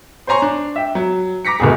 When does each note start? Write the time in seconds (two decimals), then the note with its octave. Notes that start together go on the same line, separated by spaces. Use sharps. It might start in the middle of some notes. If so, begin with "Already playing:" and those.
0.27 C5 C#5 G#5 A#5 C6 C#6
0.42 D4
0.76 E5 G5
0.95 F#3
1.45 A#5 D6 A#6 B6 C#7
1.60 D1 D2 B2 G#4